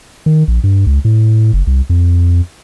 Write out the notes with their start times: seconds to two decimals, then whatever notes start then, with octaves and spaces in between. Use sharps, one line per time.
0.26 D#3
0.48 A#1
0.64 G2
0.87 C#2
1.05 A2
1.53 F#1
1.67 C2
1.90 F2